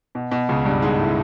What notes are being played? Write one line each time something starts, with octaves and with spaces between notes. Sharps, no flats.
B2
B2
C#2 C#3
G2 G3
G#2 G#3
A2 A3